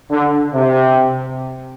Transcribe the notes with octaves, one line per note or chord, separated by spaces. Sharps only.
D3
C3